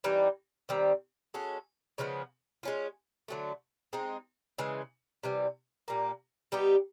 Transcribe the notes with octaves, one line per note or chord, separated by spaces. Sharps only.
E3 G3 C4 D#4
D#3 G3 C4
G#3 C#4 F#4 A4
C#3 F3 G#3 B3
G#3 C#4 F4
D3 F#3 A3
G#3 C4 D#4
C#3 E3 G#3
C3 E3 G3
A#2 G3 A#3
G3 B3 D#4 G4